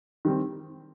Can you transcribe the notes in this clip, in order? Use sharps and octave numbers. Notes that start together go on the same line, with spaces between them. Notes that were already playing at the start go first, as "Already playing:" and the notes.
D#3 G3 C4